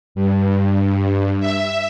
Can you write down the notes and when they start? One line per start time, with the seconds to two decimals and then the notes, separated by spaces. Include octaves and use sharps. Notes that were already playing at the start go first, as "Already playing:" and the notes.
0.15 G2
1.40 E5